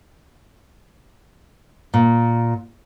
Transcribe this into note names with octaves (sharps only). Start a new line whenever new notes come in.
A#2